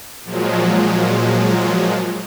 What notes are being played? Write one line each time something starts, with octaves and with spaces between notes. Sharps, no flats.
A#2 F3 F#3 G#3